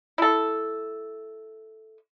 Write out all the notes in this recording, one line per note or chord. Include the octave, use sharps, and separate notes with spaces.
E4 A4